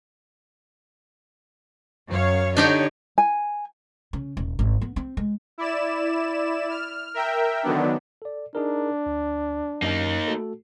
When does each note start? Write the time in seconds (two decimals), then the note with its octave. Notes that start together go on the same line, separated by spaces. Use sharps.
2.09 F#2 C#5 F5
2.57 D3 D4 D#4 G4 C#5 D#5
3.18 G#5
4.13 C#3
4.37 D#1
4.59 G#1
4.81 B3
4.96 C4
5.17 G#3
5.58 E4 D5 E7
6.70 F6
7.14 A#4 E5 G5
7.63 D3 D#3 F#3 B3 D4
8.22 A4 D5
8.55 D4 D#4 G#4 A#4
9.06 D2
9.82 F#2 A#3 D#4
10.28 A3 F#4 A4